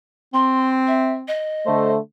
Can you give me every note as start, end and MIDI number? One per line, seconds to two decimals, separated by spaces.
0.34 1.28 60
0.34 0.69 84
0.87 1.13 76
1.28 1.90 75
1.66 1.99 50
1.66 1.99 57
1.66 1.95 72